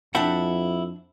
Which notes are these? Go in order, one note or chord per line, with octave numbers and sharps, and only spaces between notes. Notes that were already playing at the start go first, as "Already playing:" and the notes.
F2 D4 E4 E5 F#5 G5